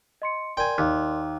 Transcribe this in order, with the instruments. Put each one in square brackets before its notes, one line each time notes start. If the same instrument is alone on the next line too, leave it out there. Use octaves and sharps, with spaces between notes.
[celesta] D#5 C6 C#7
[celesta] A#4 D5 C6 [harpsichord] G5 G#5
[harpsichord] D#2